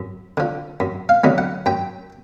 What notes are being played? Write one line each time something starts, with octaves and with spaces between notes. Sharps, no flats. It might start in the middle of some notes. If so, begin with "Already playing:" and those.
Already playing: F#2
D3 F3
F#2
F5
D3 F#3 B3 D#4
F#5
F#2 G5